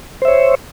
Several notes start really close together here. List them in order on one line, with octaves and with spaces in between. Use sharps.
C5 E5 C#5